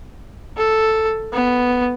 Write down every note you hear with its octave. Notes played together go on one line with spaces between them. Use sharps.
A4
B3